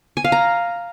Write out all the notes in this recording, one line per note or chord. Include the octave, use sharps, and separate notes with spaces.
G#5
F5
A#5